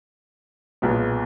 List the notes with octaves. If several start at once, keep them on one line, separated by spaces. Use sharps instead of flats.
B1 A#2 G#3 B3